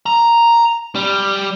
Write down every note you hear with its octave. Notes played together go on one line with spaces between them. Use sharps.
A#5
G3